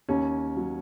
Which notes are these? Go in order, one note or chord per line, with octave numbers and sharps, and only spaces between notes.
D#2 C#4
F#3